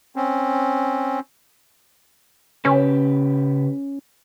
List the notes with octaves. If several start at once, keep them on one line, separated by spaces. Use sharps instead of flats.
C4 C#4
C#3 C#4 G4 B4